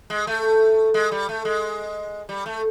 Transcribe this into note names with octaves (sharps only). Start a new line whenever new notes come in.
G#3
A3
G#3
G3
A3
G#3
G3
A3